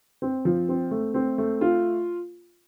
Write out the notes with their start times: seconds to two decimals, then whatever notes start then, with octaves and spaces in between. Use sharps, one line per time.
0.22 C4
0.45 F3
0.69 C4
0.91 A3
1.14 C4
1.38 A3
1.61 F4